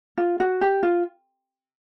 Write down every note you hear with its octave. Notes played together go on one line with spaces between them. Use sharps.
F4
F#4
G4
F4